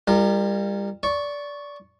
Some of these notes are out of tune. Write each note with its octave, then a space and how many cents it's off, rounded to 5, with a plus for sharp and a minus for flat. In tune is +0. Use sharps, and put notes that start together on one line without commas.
G3 +30 F4 -35 A#4 -15
D5 -20 C#6 +0